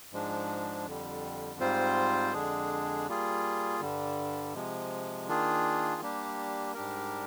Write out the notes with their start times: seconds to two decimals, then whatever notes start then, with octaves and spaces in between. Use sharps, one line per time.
0.12 G#2 F3 G#3 D4
0.85 F2 D3 G3
1.60 G#2 G3 C4 F4 C5
2.33 F2 D3 G#3 D4 G#4
3.07 G3 A#3 F4 G#4
3.80 G2 D3 G3
4.54 C3 F3 G#3
5.28 D#3 A#3 D4 F4 G#4
6.02 G3 A#3 D4 G4
6.74 G#2 G3 D4 G4 A#4